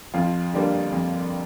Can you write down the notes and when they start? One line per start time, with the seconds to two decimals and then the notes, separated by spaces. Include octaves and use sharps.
0.14 F2 F4
0.53 D3 G3 A#3
0.92 F2